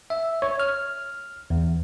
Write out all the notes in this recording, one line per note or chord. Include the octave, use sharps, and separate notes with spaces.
E5
C#5
F6
E2